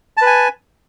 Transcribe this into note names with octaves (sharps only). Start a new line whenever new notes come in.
B4 G#5 A5